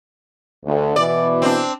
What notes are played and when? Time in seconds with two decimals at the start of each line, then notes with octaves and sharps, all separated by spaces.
0.65 D2
0.96 B2 E3 D5
1.42 C4 D4